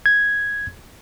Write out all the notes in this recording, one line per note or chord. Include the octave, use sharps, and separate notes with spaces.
G#6